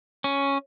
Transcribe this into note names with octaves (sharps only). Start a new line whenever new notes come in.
C#4